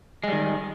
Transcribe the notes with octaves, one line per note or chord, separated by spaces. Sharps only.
D#3 G3 G#3